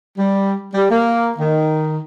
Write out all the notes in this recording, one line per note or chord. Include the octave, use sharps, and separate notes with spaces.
G3
G3
A#3
D#3